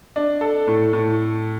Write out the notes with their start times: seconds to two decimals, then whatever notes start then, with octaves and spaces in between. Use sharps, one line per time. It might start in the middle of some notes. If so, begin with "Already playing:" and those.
0.16 D4
0.41 A4
0.67 A2
0.93 A2